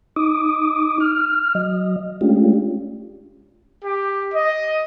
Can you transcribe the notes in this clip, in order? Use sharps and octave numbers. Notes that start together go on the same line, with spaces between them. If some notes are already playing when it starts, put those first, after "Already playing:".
D#4 D6 D#6
F6
F#3 D#5
G#3 A3 C#4 D4 F4 G4
G4
D#5